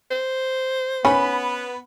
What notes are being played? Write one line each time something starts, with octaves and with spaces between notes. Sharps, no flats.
C5
B3 C#4 B5